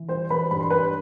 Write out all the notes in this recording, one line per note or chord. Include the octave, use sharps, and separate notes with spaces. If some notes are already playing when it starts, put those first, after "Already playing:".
Already playing: E3
G3 C5 C6
E3 B4 B5
G2 B5
C6
G2 B4 B5